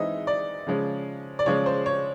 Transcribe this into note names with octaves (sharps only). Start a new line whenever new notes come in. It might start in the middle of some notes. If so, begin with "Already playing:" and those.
Already playing: E3 G#3 C4 D#4 D#5 E5
D5
C#3 F3 G#3 C#4
D5
C#3 F3 G#3 C#4 C#5
C5
C#5